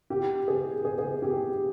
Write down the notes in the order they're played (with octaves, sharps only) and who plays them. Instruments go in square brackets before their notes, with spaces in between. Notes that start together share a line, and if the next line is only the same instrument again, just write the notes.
[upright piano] G4
G#4
G#4
G#4
G4